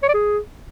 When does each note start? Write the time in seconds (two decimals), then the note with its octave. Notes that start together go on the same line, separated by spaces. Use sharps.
0.03 C#5
0.08 D5
0.14 G#4